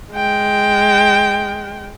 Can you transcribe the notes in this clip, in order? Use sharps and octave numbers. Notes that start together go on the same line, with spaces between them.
G#3 G5